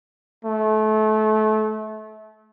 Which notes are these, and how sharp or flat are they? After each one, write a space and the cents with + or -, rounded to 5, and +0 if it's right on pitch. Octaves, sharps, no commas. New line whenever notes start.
A3 -30